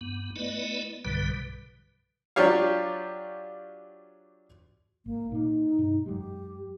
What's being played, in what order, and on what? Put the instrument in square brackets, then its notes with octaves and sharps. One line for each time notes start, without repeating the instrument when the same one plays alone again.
[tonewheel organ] G2 B3
A3 B3 E4 B4 D5 D#5
B1 G2 B2 D3 G3 B4
[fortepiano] F#3 D4 F4 G4 C#5 F5
[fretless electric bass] G#1 [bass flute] A#3
[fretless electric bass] A#2 A#3 [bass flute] D#4
[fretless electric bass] G2 B2
[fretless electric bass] F#2 F#3 G#3 [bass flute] G4